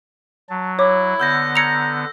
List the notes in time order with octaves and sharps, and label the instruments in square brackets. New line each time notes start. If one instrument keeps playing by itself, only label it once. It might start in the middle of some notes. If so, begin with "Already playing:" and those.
[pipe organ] F#3 [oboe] A5
[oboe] E4 [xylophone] C#5 D6
[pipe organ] D3 B3 [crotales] E6 G6 A#6
[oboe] A#5 [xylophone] G#6 C#7 F7